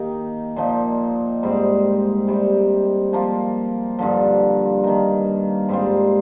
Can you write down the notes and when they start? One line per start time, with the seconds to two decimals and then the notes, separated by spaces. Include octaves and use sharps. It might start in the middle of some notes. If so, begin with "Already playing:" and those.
Already playing: D#3 A#3 D#4 G4
0.56 A#2 F3 A#3 D#4
1.43 G#2 G3 C4
2.27 C3 G3 C4
3.13 F3 A#3 F4
3.99 G2 D3 F3
4.84 D#3 A#3 D#4 A#4
5.69 G#2 G3 C4 F4